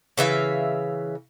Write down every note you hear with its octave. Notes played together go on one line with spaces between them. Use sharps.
C#3 E3 E5 F5